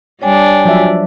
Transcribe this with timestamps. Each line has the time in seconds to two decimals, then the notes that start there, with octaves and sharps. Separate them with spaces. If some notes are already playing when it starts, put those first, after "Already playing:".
0.22 G3 D4 C#5 G5 G#5
0.65 F3 F#3 E5